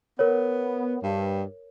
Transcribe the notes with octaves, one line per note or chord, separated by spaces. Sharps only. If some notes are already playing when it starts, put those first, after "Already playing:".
B3 A#4 C#5
G2